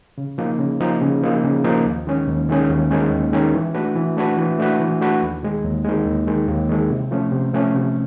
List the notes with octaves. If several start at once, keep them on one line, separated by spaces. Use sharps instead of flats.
C#3
F3 A#3 D#4
C#3
F3 A#3 D#4
C#3
F3 A#3 D#4
C#3
F3 A#3 D#4
D#2
D#3 G#3 C#4
D#2
D#3 G#3 C#4
D#2
D#3 G#3 C#4
D#2
D#3 G#3 C#4
E3
A3 D4 F#4 B4
E3
A3 D4 F#4 B4
E3
A3 D4 F#4 B4
E3
A3 D4 F#4 B4
D#2
D#3 G#3
D#2
D#3 G#3
D#2
D#3 G#3
D#2
D#3 G#3
C3
F3 A3 C#4
C3
F3 A3 C#4
C3